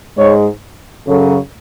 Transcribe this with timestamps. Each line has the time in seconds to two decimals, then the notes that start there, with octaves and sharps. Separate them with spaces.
0.17 G#2 G#3 C#5
1.06 F#2 C#3 F#3 A4